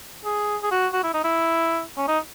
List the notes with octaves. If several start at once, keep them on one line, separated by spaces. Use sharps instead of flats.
G#4
G#4
F#4
F#4
E4
D#4
E4
C#4
D#4